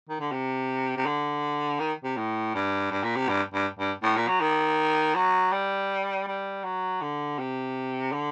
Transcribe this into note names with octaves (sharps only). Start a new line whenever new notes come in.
D#3
D3
C3
C3
D3
D#3
C3
A2
G2
G2
A#2
C3
G2
G2
G2
A2
A#2
F#3
D#3
F#3
G3
G3
F#3
D3
C3
D3